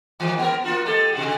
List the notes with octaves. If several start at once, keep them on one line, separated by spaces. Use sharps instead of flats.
D#2 G#2 E3
B3 A#4
A#3 F4 F#4
G#3 G4 A4
C3 G#3 F#4